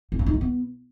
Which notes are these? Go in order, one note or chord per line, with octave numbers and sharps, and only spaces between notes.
C4
C#4
D#4
A3
B3